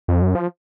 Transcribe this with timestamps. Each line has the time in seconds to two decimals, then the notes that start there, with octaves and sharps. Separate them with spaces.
0.08 F2
0.22 F#2
0.35 F3